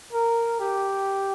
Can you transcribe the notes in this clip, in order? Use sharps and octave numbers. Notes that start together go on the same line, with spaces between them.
A#4
G4